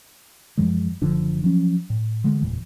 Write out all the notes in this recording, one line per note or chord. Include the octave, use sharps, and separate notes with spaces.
F#2 E3 F3 G#3
F#1 D3 F3 D4
F3 F#3 C#4
A2
D3 E3 G#3 A3
F#1 E2 A#2 E3